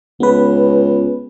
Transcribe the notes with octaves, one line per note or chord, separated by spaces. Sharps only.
C#2 B3 B4